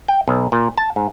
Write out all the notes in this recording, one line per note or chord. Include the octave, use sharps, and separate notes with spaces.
G5
B1
A#2
A5
G#2